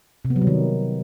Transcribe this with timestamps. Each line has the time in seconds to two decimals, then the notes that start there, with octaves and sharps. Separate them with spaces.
0.25 C3
0.30 B3
0.36 F#3
0.41 G3
0.47 D#3